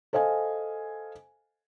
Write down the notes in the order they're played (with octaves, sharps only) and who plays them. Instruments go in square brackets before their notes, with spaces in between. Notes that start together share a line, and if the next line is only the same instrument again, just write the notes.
[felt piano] A4 C5 D#5 F5 G#5